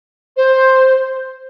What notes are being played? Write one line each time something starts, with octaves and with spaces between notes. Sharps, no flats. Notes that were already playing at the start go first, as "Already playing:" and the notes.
C5